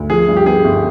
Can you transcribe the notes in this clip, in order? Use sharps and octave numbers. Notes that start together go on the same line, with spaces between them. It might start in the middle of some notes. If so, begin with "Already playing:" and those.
Already playing: D2
F3 G#4
G2
G4
B3 G#4
G1